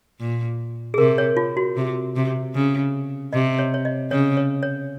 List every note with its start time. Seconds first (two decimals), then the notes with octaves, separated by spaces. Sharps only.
0.20 A#2
0.94 G#4
0.98 C3 A#4
1.18 C#5
1.37 F4
1.57 F#4
1.76 C3
2.16 C3
2.54 C#3
3.33 C3 D#5
3.59 C#5
3.74 C#5
3.85 D#5
4.11 C#3 C#5
4.37 C#5
4.63 C#5